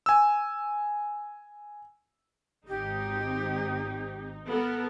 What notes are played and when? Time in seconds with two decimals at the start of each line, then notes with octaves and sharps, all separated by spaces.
0.06 G#5 E6
2.68 G#1 C4 D#4 G4
4.49 B3 A4 A#4